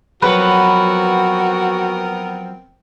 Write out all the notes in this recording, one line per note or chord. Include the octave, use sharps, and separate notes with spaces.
F3 F#3 B3 C4 F#4 A#4 B4 C#5